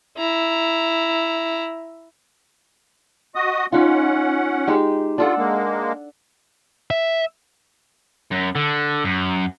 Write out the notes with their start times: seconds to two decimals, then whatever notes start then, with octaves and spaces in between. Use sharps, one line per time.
0.18 E4 A#5
3.35 F#4 D#5 D#6
3.72 C#4 D#4 F4 F#5
4.67 G#3 D#4 G4
5.18 D4 F4 A4 F#5
5.38 G#3 A#3
6.91 E5
8.32 F#2
8.55 D3
9.04 F#2